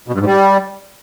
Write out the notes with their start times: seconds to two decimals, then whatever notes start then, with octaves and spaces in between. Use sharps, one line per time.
0.08 B2
0.14 G2
0.20 G#2
0.26 G3